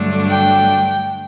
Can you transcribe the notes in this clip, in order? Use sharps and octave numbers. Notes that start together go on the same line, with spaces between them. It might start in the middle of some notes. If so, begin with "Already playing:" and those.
Already playing: G2 D3 F#3 A3 D4
G5